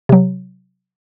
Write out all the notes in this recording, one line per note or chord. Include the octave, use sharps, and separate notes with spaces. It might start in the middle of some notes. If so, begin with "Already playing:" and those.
C3 F#3